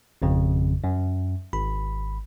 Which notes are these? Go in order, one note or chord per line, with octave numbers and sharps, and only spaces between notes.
G#1 F2 C#3
F#2
G#1 B5